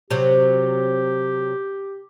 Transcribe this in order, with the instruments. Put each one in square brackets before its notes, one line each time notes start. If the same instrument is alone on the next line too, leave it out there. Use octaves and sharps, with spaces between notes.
[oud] C3 F#3 [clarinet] G4